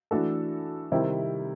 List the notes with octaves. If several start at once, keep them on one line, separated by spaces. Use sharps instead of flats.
E3 A3 D4 F#4 A4
C3 D#3 G3 C4 E4